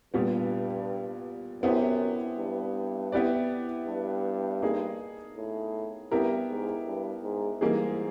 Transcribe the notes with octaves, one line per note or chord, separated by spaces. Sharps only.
G2 A#2 G3 B3
F#2 B3 E4 G4 C5
G2
B3 E4 G4 B4 D5
G2
A#3 D#4 G#4
A2
G2 B3 E4 G4 A#4
G#2
G2
G#2
G#2 E3 G3 A#3 D#4 G#4